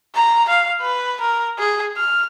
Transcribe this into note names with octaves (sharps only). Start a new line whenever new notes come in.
A#5
F5
B4
A#4
G#4
F6